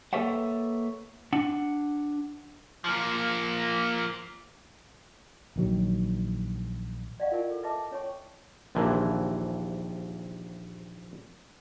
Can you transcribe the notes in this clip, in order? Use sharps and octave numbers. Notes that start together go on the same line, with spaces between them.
A#3 A4 B4 C#5 E5 F#5
D4 F#5
F3 A#3
A#1 D#3 F#3
D5 D#5 F5 F#5 C#6
E4 F4 A#4 D5 G#5
A4
B4 D#5 E5 A5 A#5 D6
C#4 C#5 G#5 C#6
A#1 D#2 C3 E3